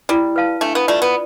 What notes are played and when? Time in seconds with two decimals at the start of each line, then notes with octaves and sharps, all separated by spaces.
0.09 G3 E4
0.36 B4 F5 A5
0.61 A3 D4
0.75 B3
0.87 A3 F4 B4 D5
1.02 B3